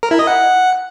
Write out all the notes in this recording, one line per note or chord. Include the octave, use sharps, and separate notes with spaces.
A#4
E4
D#5
F#5